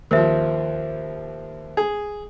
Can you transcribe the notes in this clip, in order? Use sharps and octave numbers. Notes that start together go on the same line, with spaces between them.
D#2 F3 A#4 C5 E5
G#4